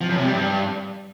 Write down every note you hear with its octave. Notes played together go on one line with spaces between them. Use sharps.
F3
F#2
C3
G3
G2